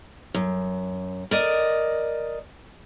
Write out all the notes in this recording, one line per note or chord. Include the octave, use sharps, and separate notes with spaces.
F#2
A#4 D5 D#5